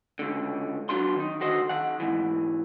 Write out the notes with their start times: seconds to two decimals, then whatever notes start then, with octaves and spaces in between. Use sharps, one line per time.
0.19 C#2 D3
0.89 F#3 B3 D4 F4 F#4 C6
1.16 D#3 D#4
1.40 D3 F#4 C5 D#5
1.69 D#3 F#5
2.00 G#2 E3